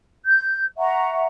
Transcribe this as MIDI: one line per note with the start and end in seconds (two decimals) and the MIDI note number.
0.25 0.65 91
0.78 1.27 76
0.78 1.27 78
0.78 1.27 82
0.78 1.27 85